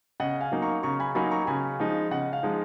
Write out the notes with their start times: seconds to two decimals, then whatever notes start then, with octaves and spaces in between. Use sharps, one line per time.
0.20 C#3 D#5 F#5
0.41 F5 G#5
0.52 F#3 A#3 D#4
0.62 A#5 C#6
0.83 C#3 A#5 C#6
1.00 G#5 B5
1.15 F#3 A#3 D#4 G#5 B5
1.31 A#5 C#6
1.41 A#5
1.47 C#3 G#5 B5
1.80 F3 G#3 D#4
2.11 C#3 D#5 F#5
2.33 F5
2.43 F3 G#3 D#4